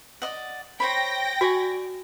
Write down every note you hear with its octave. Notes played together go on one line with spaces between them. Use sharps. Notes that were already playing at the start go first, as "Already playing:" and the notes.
D5 D#5 F#5
C5 C#5 G5 B5 A#6
F#4 D5 G#5 C#6